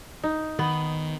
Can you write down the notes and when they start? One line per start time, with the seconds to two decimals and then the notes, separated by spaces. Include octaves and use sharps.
0.23 D#4
0.59 D#3 B3